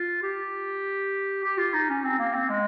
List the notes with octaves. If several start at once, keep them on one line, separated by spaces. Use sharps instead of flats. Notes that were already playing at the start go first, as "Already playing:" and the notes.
Already playing: F4
G4
G4
F4
D#4
C#4
C4
A#3
C4
G#3